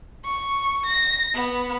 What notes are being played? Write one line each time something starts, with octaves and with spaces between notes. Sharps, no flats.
C#6
A#6
B3